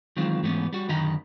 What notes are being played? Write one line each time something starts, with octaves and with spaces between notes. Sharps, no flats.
D#3 E3 F#3 G#3 C4 F4
G#2 E3 A3 B3 C#4
G3 F#4
F#2 D3 D#3 D#5 A#5 B5